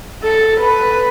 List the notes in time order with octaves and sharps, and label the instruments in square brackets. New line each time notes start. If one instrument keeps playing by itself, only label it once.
[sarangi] A4
B4